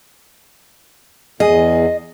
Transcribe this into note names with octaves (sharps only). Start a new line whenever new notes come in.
E2 G#4 D#5